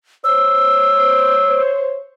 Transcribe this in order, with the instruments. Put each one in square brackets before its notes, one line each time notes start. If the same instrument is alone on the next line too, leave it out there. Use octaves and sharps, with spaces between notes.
[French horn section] C5 C#5 [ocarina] E6